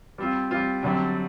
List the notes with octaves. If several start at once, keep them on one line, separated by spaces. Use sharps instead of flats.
G3 C4 F4
G3 C4 F4
F#2 D3 G3 C4